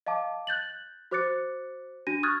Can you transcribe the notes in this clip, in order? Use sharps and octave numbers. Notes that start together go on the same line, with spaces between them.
D#5 F5 A5 D6
F#6 G6 A6 F#7
F#4 C5 D6 F#6 A6 C#7
D4 F#4 A#6 D#7
C#6 D#6 F6 F#6 G#6 A6